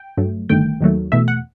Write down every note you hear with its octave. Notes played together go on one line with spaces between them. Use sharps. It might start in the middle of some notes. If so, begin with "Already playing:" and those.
Already playing: G5
G1 G2 F#3 A3
G1 G2 D#3 A3 G5
D#2 D#3 F#3 A3
E2 B2 A3 E5
F#5